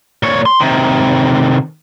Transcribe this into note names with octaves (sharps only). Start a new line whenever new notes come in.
A#2 C#5
C6
C3 D#3